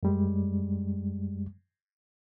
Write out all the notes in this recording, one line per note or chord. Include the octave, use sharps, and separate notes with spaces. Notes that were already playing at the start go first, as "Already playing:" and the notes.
F#2 G3 G#3